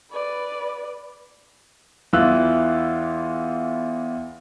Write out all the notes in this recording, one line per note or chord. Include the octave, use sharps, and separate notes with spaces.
B4 D5
E2 E3 F4 E6 F#6